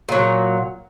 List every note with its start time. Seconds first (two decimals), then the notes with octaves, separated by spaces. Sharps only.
0.09 A#2 F#3